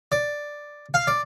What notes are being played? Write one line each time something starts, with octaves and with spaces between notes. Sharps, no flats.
D5
F5
D5